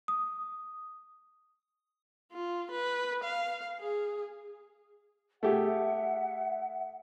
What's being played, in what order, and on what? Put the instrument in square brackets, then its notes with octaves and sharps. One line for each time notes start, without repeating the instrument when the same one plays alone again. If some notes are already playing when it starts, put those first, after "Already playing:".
[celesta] D#6
[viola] F4
B4
F5
G#4
[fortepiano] A3 G4 G#4 [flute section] E5 F#5